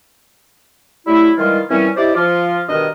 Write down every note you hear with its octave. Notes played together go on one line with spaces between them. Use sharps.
F#3 G3 A3 E4
D#3 E3 G3 G#3 F4
A#2 E3 G3 C4 C#4
D#4 E4 G4 C5 D5
F3 F4
G2 B2 D#3 D4 A#4 D#5